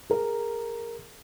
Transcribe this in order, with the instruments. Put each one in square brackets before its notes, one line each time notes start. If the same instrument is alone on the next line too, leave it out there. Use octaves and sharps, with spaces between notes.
[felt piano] G#4 A#4